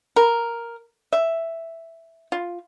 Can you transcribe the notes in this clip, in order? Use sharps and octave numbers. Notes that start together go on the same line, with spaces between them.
A#4
E5
F4